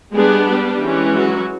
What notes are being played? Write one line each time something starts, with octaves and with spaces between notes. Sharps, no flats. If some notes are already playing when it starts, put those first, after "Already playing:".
G3 G#3 B3 D4 G#4
G3 G4
E3 G#3 C#4
F#3 F#4